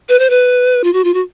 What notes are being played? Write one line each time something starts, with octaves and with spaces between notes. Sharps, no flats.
B4
C5
B4
F4
F#4
F4
F#4